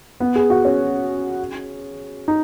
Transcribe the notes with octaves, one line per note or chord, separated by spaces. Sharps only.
B3
G#4
F#4
C#4
D#4